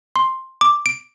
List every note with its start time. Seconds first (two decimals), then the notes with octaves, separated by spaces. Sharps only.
0.16 C6
0.61 D6
0.86 D7